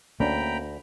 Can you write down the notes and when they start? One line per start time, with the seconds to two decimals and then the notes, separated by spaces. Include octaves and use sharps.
0.20 D2 A#3 C#4 D4 G5 A#5 B5